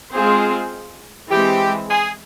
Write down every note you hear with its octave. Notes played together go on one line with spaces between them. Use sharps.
G#3 C4 F4 G#4 C5
E3 G#3 C4 G4
G#4